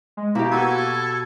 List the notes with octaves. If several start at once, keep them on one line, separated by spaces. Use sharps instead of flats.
G#3
B2 A#3 E4 G4
F#4 A4 B4 G#6